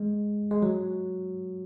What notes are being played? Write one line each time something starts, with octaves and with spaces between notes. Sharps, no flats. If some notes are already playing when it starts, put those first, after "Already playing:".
Already playing: G#3
G#3
F#3